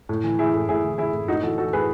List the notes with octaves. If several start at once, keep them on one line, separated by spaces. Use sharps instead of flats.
A2
E3
E3 E4 G#4
A2
A2 E4 G#4
E3
E3 E4 G#4
A2
A2 D#4 F#4
E3 F#4 A4
E3 F#4 A4
A2 G#4 B4